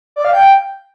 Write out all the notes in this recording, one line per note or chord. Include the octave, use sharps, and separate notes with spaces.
D5
F5
G5